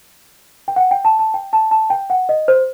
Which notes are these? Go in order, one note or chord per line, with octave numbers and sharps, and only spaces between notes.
G5
F#5
G5
A5
A5
G5
A5
A5
G5
F#5
D#5
C5